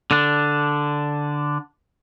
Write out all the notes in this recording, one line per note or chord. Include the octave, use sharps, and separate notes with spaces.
D3 D4